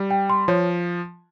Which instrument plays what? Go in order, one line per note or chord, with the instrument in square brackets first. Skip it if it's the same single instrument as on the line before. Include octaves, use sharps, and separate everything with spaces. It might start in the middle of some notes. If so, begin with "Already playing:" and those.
Already playing: [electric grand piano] G3
[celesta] G5
C6
[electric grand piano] F3 [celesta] C#5